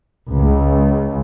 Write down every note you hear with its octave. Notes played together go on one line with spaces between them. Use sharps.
C#2